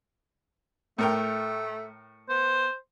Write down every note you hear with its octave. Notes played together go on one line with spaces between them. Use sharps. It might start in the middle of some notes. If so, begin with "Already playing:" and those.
A2 A3 A#4 G5
B3 C5